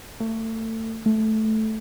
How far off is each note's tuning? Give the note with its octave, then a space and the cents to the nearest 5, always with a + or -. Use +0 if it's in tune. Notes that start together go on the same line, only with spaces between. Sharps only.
A3 +30
A3 -10